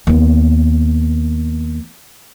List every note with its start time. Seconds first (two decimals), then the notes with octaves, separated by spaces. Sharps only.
0.07 D#2 B3